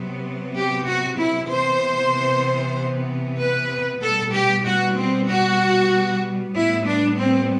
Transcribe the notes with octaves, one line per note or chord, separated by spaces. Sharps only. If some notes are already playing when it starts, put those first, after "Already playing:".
Already playing: C3 F#3 B3
G4
F#4
E4
C3 E3 B3 C5
B4
B2 G3 B3 A4
G4
F#4
C4
F#4
A2 G3 B3 E4
D4
C4